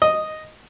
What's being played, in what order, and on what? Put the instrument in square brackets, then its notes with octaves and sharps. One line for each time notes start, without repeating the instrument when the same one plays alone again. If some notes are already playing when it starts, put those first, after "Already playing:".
[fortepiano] D#5